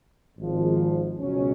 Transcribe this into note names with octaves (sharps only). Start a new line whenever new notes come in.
G#1 G#2 F3
C#2 B2 F#3 C#4